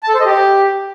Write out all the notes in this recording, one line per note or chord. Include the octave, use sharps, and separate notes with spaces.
A5
A4
C5
D#5
G4